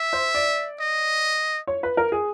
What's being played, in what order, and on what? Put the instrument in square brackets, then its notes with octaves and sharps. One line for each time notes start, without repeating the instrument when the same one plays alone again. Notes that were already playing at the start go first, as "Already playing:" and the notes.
Already playing: [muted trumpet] E5
[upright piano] C5
D5
[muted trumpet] D#5
[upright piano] C#5
B4
A#4
G#4